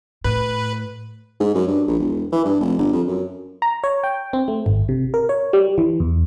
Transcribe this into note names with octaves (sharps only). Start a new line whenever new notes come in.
A2 B4
G#2
F#2
G2
A#1
E1
E3
G2
F1
G1
F2
F#2
A#5
C#5
G5
C4
A3
G#1
C3
A#4
C#5
G3
E3
E2